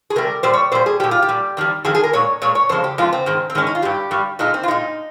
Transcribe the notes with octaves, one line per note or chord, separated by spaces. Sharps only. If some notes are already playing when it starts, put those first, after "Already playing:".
G#4
C3 G3 A#4
A#2 G3 C5
C#5
A#2 G3 C5
G#4
A#2 G3 G4
F4
G4
A#2 G3
F2 D#3 G3
F2 D#3 G3 G#4
G#4
A#4
A#2 G#3 C#5
A#2 G#3 C#5
C#5
F2 C#3 G#3 C5
G4
F2 C#3 G#3 F4
C4
G#2 D#3 G#3
C4
G#2 D#3 G#3 C#4
D#4
F4
G2 G3 G4
G2 G3
A#2 G#3 D#4
C4
F4
A#2 G#3 D#4